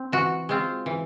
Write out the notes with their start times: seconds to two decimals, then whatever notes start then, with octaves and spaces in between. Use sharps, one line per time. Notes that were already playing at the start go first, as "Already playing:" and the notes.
Already playing: C4
0.12 E3 F#4
0.49 G#3 C4 F4
0.86 E3